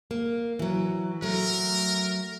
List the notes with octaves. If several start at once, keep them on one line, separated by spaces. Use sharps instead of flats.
A#3
E3 F#3
F#3 A3 A#4